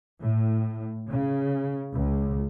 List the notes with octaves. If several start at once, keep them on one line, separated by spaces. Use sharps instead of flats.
A2
C#3
C#2